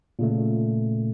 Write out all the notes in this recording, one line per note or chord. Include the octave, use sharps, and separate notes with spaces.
A#2 C#3 A3